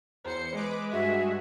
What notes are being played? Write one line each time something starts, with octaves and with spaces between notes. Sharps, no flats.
E2 C5 C#7
G#3 B4 D6
G2 F#4 G#4 E5